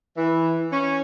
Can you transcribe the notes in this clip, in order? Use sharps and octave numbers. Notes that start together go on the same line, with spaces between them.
E3
C#4